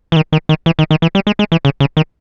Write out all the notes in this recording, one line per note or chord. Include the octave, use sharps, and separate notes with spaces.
E3
D#3
D#3
D#3
E3
D#3
D#3
E3
G3
G#3
G#3
E3
C#3
C#3
D#3